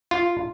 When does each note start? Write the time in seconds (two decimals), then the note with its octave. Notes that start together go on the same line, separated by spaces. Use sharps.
0.11 F4